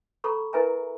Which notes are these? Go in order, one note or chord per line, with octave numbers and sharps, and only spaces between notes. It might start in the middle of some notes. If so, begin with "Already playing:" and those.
A4 A#5 B5 C#6
E4 A#4 B4 E5 G#5 A#5